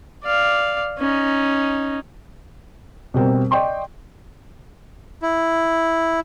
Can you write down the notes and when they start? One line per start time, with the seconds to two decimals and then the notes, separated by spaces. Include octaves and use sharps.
0.24 D5 F5
0.99 C#4 D#4
3.14 B2 G3 C4 A#4
3.51 D5 D#5 G5 C6 C#6
5.22 E4